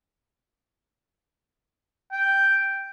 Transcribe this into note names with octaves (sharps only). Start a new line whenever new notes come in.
G5